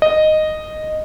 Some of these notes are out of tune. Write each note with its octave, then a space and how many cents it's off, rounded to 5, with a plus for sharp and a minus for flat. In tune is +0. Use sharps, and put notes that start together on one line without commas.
D#5 -5